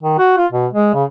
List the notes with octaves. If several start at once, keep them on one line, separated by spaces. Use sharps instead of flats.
D#3
F#4
F4
B2
G#3
C#3